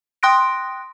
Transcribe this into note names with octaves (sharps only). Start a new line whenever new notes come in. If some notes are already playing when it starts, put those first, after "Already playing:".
G5 C6 D#6 F#6 A#6 D7